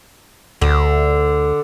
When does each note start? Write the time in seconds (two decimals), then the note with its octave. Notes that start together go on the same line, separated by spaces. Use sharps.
0.61 D2 D3